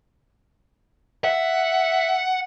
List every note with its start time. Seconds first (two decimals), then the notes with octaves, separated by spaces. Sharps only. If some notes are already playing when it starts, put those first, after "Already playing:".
1.24 E5 F#5